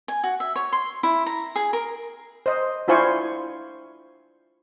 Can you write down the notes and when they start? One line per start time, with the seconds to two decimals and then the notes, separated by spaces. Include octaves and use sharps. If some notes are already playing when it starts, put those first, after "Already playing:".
0.08 G#5
0.24 F#4
0.40 E5
0.56 C#5
0.72 C6
1.03 E4
1.26 A#5
1.56 G#4
1.73 A#4
2.46 C5 D#5
2.88 D4 E4 F4 C5 G#5 C#6